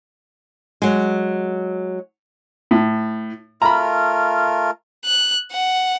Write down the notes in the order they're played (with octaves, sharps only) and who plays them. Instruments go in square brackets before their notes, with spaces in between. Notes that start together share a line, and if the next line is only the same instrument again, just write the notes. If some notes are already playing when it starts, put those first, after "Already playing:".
[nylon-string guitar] F#3 G#3
[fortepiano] A2
[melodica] A3 F4 A#4 [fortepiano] A#5 B5
[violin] F#6
F#5